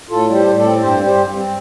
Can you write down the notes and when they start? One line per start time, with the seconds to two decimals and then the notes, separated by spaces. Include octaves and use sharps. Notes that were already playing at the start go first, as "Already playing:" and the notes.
0.10 A2 F4 A4
0.28 G3
0.34 G4 C5
0.46 A2
0.58 A4 D5
0.64 C4
0.82 G2 G4 C5
1.00 G3
1.05 G4 C5
1.18 G2
1.35 C4